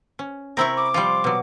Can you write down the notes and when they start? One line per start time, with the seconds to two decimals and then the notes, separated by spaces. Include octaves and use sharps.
0.19 C#4
0.57 C3 C4 E4 A#4 B5 C#6
0.76 D6
0.94 F3 G3 F4 C6
1.24 B2 F#3